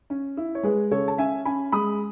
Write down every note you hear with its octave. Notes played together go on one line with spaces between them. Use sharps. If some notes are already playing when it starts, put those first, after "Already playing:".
C#4
E4
C#5
G#3 G#4 B4
C#3 A4 C#5
A5
C#4 E5 G#5
C#4 G#5 B5
G#3 B5 D#6